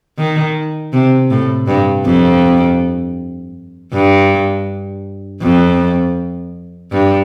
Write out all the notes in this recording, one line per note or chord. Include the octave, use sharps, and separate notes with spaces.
D#3
C3
A2
G2
F2
G2
F2
G2